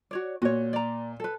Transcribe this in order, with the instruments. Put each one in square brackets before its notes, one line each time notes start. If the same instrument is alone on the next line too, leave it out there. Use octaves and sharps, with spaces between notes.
[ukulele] F#4 C#5 D5
[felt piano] A#2 [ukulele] F#4 C#5
[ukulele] D5 A#5
A4 B4